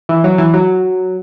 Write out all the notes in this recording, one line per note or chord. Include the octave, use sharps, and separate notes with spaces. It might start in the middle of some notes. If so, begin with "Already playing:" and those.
E3
F#3
E3
F#3